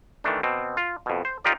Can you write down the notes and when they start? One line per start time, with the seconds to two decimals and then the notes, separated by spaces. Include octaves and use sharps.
0.24 D#3 E3 A3 D4
0.43 B2 C4
0.77 F4
1.06 F2 B2
1.25 C5
1.44 D#4 F4 G4 A#4 D5